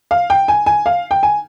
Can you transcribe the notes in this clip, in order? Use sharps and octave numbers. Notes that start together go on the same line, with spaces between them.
F5
G5
G#5
G#5
F5
G5
G#5